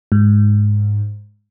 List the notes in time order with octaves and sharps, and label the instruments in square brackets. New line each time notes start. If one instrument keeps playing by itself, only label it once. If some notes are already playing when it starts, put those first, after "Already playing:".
[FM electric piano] G#2